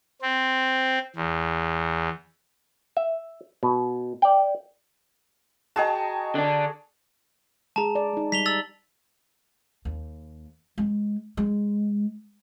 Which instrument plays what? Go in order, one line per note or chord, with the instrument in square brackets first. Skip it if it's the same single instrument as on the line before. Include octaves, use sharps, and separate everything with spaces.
[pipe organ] C4
E2
[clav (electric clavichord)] E5
B2
D5 G5
[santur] F#4 G#4 A#5 [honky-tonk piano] D#5 G5 A5
[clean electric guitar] D3 D4
[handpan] G#3 G#4 [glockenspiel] A5 A#5
[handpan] D5
G#3 D#4
[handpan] G3 [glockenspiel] B6 F7 G7
[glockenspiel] E6 A6 F#7
[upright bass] D#2
G#3
G#3